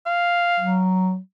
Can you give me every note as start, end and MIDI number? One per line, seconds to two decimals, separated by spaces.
0.06 0.83 77
0.60 1.18 54